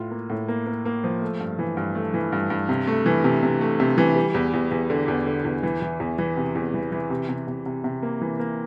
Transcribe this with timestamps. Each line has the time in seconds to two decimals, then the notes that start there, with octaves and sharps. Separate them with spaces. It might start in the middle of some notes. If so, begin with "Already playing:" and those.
Already playing: A2 F4
0.11 A#3
0.30 A2
0.48 A#3
0.66 A#3
0.85 A#3
1.04 F3
1.22 A3
1.40 G2
1.59 E3
1.77 G2
1.95 A3
2.14 E3
2.32 G2
2.50 G2
2.69 C3
2.87 A3
3.06 E3
3.24 C3
3.43 C3
3.61 A3
3.80 C3
3.98 E3
4.16 G3
4.35 E2
4.54 E2
4.71 E2
4.90 D3
5.08 E2
5.27 D3
5.45 E2
5.63 E3
5.82 E3
6.00 E2
6.18 E3
6.37 C3
6.55 E2
6.74 E3
6.92 E3
7.10 C3
7.29 C3
7.47 C3
7.66 C3
7.84 C3
8.03 A#3
8.21 E3
8.39 A#3